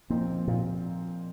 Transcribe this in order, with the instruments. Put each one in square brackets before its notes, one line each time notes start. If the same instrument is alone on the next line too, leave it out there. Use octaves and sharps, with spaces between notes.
[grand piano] A#2 F3 C4 D#4 [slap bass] A#3
[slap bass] A#2